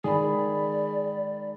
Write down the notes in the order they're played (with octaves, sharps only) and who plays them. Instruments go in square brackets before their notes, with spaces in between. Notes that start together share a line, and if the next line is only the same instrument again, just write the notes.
[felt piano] D#3 B5 [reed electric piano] G#3 [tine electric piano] G#4 [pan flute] D5